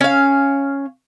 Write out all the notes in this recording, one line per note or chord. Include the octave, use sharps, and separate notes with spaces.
C#4 F5